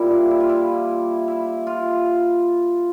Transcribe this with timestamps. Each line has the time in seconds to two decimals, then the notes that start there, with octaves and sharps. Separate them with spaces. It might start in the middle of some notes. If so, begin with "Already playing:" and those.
Already playing: A#2 G3 E4
0.11 D4
0.31 E4
0.40 F4
0.49 E4
1.28 E4
1.67 F4